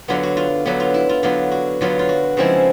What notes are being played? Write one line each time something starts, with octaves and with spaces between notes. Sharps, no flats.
D3 F#3 B3 F4
F#4
F4
D3 F#3 B3
F4
E4
F4
D3 F#3 B3 F4
F#4
D3 F#3 B3 F4
F4
F#4
C#3 F3 G#3 C4 E4